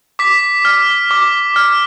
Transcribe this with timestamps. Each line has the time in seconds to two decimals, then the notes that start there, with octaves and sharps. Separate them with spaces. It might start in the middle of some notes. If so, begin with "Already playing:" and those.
0.19 D6 B6
0.65 F6
1.11 D6
1.56 F6